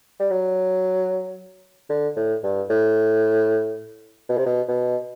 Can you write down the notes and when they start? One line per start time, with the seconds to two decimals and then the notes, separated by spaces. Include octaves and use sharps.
0.20 G3
0.31 F#3
1.89 D3
2.16 A2
2.43 G2
2.70 A2
4.29 B2
4.38 C3
4.46 B2
4.68 B2